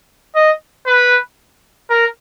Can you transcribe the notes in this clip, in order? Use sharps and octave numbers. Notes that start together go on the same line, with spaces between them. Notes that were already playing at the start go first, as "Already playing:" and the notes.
D#5
B4
A#4